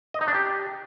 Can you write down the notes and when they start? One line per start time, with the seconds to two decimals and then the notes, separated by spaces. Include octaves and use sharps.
0.14 D#5
0.21 D#4
0.28 D4
0.34 G4